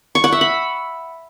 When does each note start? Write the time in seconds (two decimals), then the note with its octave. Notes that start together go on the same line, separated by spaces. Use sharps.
0.15 C#6
0.24 F#5
0.32 E5
0.41 B5